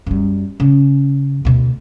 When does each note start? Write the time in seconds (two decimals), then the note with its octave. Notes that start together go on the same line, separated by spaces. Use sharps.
0.06 F#2 G3
0.60 C#3
1.45 D2 B2